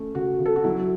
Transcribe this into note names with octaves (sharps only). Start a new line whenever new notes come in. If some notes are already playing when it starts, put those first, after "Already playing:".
Already playing: A3 C#4
C#3 F#4
C#3
A4
F#4
F#3 E4